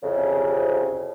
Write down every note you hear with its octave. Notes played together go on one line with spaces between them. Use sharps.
C2 F2 C#3